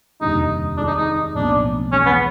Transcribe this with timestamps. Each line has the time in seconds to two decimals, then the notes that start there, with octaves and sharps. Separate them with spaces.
0.21 F1 D#2 D3 G3 D#4
0.77 C3 D#3 G#3 D4
0.87 D#4
0.97 D#4
1.35 B1 A2 F3 A#3 C#4 D4
1.92 E2 C#3 E3 G#3 C#4
2.06 B3